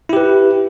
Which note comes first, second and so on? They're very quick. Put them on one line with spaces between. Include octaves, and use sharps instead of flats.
E4 G4 B4